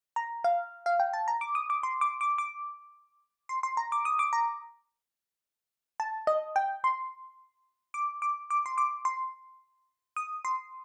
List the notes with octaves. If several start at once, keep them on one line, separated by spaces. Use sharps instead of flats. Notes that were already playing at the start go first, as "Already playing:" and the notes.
A#5
F5
F5
G5
A5
A#5
D6
D#6
D6
C6
D6
D6
D6
C6
C6
A#5
D6
D#6
D6
A#5
A5
D#5
G5
C6
D6
D6
D6
C6
D6
C6
D#6
C6